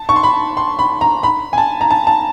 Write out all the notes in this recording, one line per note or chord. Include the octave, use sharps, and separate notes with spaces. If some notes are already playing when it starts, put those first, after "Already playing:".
Already playing: A5
C#6
C6
B5
C6
B5
A#5
B5
G#5
A5
A#5
A5
A5